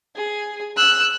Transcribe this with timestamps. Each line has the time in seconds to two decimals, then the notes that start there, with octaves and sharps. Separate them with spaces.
0.16 G#4
0.77 E6 F#6